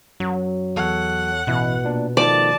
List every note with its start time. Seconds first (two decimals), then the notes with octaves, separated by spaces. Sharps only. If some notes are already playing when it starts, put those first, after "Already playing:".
0.20 F#2 F#3
0.76 E2 A4 C#5 F#5
1.47 A1 B2 E4 F#6
1.84 A#2 D4
2.17 D#3 F3 A3 D5 A5